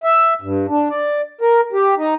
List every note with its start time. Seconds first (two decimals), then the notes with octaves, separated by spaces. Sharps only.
0.04 E5
0.42 G2
0.68 D4
0.90 D5
1.41 A#4
1.73 G4
1.97 D#4